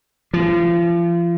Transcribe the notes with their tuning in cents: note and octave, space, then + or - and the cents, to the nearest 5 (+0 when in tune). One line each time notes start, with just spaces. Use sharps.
F3 -35